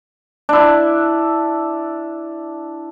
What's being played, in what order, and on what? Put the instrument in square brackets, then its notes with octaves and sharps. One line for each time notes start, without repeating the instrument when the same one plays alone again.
[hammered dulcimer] D4 E4